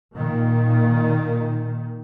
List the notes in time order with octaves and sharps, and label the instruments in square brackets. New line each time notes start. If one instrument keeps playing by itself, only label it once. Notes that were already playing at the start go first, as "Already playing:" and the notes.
[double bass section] A#2 D#3